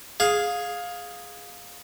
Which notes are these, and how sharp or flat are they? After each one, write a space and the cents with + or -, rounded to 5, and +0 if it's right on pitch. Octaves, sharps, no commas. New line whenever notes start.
G#4 +0 F5 +15